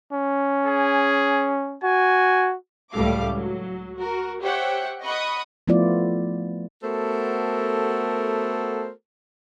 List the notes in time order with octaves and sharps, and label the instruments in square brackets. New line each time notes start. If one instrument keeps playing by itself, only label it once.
[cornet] C#4
[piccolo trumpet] G#4
[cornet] F#4 [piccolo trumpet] G#5
[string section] C#2 A2 G3 A3 F5 D6
F#3
F#4 A#4
G4 C5 C#5 E5 F#5 G5
D#5 F#5 B5 C#6 D#6
[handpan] F3 A3 B3 E4 F4 D5
[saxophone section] A3 B3 F#4 A4 A#4 C5